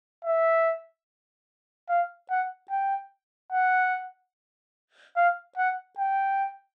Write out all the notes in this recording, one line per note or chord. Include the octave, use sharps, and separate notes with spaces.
E5
F5
F#5
G5
F#5
F5
F#5
G5